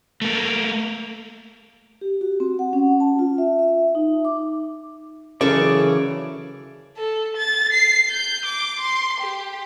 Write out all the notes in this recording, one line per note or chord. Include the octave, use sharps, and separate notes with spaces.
A3 A#3
G4
F#4
C4
F#5
C#4
A5
F4
E5
E5
D#4
D6
F#2 C#3 E3 C#4 G#4 A4 D5 C#6
A4
A6
C7
G6
D6
C6
G4